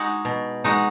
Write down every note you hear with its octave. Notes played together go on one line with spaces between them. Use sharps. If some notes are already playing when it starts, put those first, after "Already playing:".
Already playing: G#3 D#4 F#4
B2
G#3 D#4 F#4